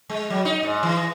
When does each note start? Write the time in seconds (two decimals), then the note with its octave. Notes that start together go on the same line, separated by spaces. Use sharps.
0.10 G#3
0.30 F#3
0.45 D#4
0.63 G#2
0.83 E3